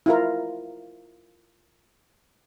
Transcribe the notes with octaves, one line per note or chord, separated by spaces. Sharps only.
E4 F4 A#4